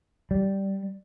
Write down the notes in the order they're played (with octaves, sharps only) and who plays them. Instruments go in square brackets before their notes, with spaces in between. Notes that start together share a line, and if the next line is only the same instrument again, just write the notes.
[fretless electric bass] G3